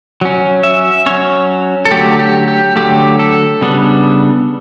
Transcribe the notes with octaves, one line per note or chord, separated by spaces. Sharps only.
F#3 C#4
E5
F#3 C#4 C#5
A4
D3 F#3 A3 G4
G4
G4
D3 F#3 A3 G4
A4
C#3 G3 B3 D4